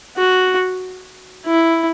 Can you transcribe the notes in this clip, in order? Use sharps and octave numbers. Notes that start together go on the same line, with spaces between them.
F#4
E4